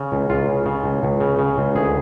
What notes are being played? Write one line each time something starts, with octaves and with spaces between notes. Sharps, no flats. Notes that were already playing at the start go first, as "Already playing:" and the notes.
Already playing: C#3
C#2
C#2 F4
C#3
C#3
C#2
C#2
C#3
C#3
C#2
D2 G#4